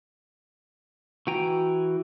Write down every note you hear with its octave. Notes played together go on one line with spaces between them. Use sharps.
E3 F#4 G5 G#5 A#5